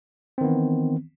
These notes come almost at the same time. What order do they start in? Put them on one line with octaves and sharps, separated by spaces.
C4 D#3 B3 E3